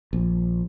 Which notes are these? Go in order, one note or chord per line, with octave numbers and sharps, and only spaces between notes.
A#1